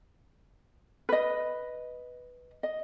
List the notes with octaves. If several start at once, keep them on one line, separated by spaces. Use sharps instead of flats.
B4 D#5
D#5